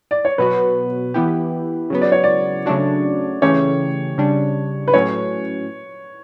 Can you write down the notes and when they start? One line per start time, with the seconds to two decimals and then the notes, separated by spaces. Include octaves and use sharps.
0.11 D5
0.25 C#5
0.38 B2 F#3 B3 F#4 B4
1.14 E3 B3 E4 G4
1.90 C#3 F#3 B3
2.01 D5
2.12 C#5
2.24 D5
2.66 C#3 F#3 A3 D4 F#4
3.42 C#3 E3 A3 C#4 G4 C#5
4.18 C#3 G3 D4
4.88 B4
4.94 A2 F#3 C#4 C#5